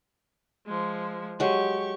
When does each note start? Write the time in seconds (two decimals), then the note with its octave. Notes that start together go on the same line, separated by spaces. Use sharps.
0.66 F3 G#3
1.40 F#3 G#3 G4 C#6